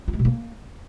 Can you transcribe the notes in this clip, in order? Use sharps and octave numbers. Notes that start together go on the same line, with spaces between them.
F4
G#3
B2
A#3